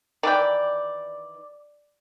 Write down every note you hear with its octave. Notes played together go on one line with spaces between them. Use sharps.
D#3 E3 D5 G5